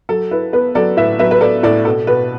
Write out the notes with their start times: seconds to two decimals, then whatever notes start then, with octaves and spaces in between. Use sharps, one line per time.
0.09 F#3 A4
0.31 E4 B4
0.53 B3 B4
0.75 F#3 A4 D5
0.97 A2 B4 E5
1.19 F#3 B4 E5
1.31 B4
1.41 B3 A4 D5
1.63 A2 A4 D5
1.85 B2 A4
2.07 B2 B4